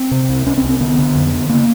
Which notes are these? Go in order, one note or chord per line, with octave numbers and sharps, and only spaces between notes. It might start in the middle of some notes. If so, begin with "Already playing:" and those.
Already playing: C4
C3
C2
C2 C#4
C4
C2
C4
D3 B3
D3
F2
D3
C#3 A#3